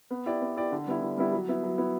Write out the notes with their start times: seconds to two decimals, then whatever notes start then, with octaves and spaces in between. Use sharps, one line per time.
0.11 B3
0.26 E4 G4 D5
0.42 B3
0.56 E4 G4 D5
0.72 D3
0.87 G3 B3 E4
1.02 D3
1.18 G3 B3 E4
1.32 F#3
1.48 B3 E4
1.64 F#3
1.78 B3 E4